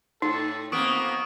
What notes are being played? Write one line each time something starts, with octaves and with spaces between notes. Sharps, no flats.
A2 D#4 A4
F2 A#3 B3 C#6 D#6 D7